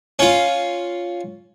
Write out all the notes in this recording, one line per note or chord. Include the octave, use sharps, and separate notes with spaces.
C#4 F4